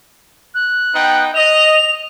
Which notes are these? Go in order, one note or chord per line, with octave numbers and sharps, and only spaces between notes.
F#6
B3 D#4 G5
D#5 F7